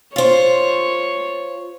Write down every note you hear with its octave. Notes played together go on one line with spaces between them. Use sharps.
F4 C5 C#5